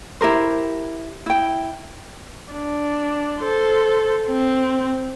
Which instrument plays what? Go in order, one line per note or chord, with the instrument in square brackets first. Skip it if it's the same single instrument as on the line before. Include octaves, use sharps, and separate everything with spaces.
[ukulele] E4 G4 A#4 C5
E4 G5
[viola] D4
A4 C5
C4